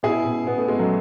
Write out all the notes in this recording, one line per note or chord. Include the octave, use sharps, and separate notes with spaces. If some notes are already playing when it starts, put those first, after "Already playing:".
B2 E4 G#4
B2
B2 B3
A3
B2 G#3
F#3 A3